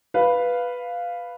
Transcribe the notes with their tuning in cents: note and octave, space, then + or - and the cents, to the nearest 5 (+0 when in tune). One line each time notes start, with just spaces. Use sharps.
B4 +0 F5 +0